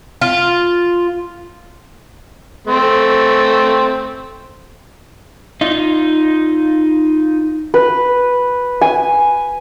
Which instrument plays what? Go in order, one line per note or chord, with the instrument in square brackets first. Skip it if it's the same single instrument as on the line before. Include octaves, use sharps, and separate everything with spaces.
[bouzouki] F4
[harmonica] A3 C4
[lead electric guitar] D#4 F4
[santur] B4
G#5